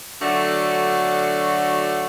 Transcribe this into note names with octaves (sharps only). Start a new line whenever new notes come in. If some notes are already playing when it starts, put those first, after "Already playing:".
D3 F#3 A3 D4 F#4